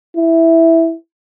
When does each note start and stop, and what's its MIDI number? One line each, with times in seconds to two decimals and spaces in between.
0.17 0.94 64